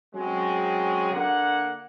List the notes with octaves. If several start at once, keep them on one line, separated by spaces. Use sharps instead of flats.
F#3 G#3 C4 C#4 G#4
D3 A#3 F#5